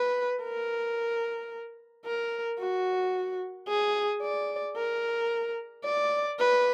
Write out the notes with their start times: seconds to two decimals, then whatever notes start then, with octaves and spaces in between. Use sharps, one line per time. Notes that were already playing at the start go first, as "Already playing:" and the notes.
Already playing: B4
0.42 A#4
2.05 A#4
2.59 F#4
3.68 G#4
4.22 D5
4.76 A#4
5.84 D5
6.39 B4